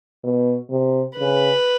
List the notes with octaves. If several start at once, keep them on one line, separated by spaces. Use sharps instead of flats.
B2
C3
C#3 B4